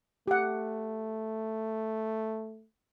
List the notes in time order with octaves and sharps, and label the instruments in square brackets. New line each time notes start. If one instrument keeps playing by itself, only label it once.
[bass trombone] A3 [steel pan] G4 F#5